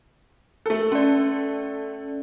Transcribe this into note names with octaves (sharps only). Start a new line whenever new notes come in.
A3 A4
C#4 D5